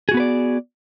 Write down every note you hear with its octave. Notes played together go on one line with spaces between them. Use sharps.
B3 F#4 G#4 B4 D5